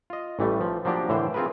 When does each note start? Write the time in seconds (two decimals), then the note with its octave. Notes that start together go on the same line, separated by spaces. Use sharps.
0.10 F4 D#5
0.39 A1 E3 G3 A3
0.61 F3
0.85 F3 F#3 A#3 D4 G4
1.09 A2 D3 E3 C5 G5
1.34 C4 F4 G#4 A#4 B4